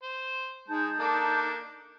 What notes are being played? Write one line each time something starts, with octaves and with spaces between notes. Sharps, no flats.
C5
G#3 D#4 A5 G6
A#3 D4 A4